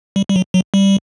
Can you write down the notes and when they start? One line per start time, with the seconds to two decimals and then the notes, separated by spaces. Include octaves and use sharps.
0.16 G3
0.29 G3
0.36 F#3
0.54 F#3
0.74 G3